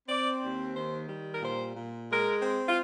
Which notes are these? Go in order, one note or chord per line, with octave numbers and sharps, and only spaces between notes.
C4 D5
D#2
D#3 C5
G3
A#4
A#2 C5
A#2
G#3 A#4
C4
F4